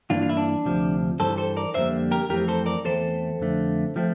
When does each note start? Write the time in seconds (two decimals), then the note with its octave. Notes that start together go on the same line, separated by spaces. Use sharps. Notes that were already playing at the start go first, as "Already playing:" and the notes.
0.10 G2 E3 A#3 D4 F4
0.22 F4
0.29 E4
0.37 D4
0.65 D2 C3 F3
1.20 G2 E3 G3 A4 C5
1.38 A4 C5
1.57 A#4 D5
1.74 F2 D3 G3 A#3 C5 E5
2.11 G4 A#4
2.29 F2 E3 A3 C4 G4 A#4
2.48 A4 C5
2.66 A#4 D5
2.85 E2 E3 A3 C4 A4 C5
3.39 F2 D3 A3
3.96 F3 A3 C4